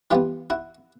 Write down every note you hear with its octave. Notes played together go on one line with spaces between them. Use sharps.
E3 G3 B3 F4 G4
E4 F#4